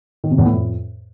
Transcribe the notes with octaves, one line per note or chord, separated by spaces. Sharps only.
D#3
C3
E2
A2
F2